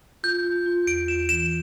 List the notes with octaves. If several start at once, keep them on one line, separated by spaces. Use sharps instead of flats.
F4 G6
F4
F4
E2 D7
F4 E7
E3 E7